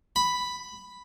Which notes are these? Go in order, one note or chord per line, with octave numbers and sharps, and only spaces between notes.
B5